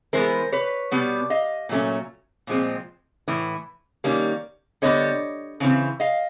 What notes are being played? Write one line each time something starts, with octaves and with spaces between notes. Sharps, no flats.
E3 G#3 B3 A#4 C5
B4 C#5
B2 G3 B3
D#5 F5
A#2 F#3 A3 C#4
A#2 F3 G#3 C4
A2 E3
D#3 G3 A#3 C#4
D3 G3 B3 C#5 D#5
C#3 E3 C4
D#5 F5